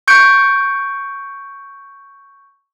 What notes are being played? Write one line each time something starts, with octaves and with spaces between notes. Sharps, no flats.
C#6 G6 C#7 D7